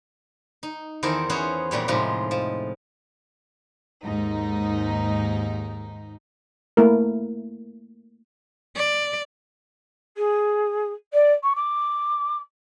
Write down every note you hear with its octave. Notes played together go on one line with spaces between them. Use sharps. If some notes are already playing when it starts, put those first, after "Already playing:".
D#4
E2 D#3 E4 A4 A#4 C5
B3 C#4 G#4 C5 C#5
F2 A#2 G3 C#5
A2 C3 F3 G#3 D#4
F3
D#2 G#2 D#4
A3 A#3 E4 A#4
D5
G#4
D5
C#6
D6